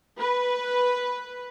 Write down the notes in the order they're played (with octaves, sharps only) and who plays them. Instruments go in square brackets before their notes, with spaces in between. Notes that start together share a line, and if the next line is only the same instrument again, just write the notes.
[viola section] B4